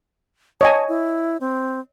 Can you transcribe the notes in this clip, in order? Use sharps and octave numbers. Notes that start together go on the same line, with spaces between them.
C#5 D#5 G#5 A5
E4
C4